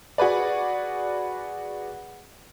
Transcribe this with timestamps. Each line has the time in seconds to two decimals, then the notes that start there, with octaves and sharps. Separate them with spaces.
0.18 F#4 G#4 B4 D5